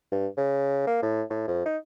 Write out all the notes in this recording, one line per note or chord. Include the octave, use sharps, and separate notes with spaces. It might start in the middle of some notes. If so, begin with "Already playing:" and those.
G2
C#3
A#3
A2
A2
F2
D#4